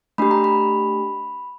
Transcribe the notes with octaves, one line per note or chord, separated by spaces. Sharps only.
A3 D4 G4 B5
A#5
B5